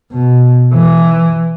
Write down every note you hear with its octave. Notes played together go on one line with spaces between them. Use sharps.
B2
E3